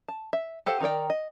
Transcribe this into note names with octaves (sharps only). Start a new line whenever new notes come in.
A5
E5
G4 A4 C5 F5 F#5
D#3 D#4 A#4 D5 G5
D#5